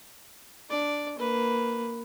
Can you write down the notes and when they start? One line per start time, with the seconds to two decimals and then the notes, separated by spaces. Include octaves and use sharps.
0.70 D4 D5
1.18 A#3 B4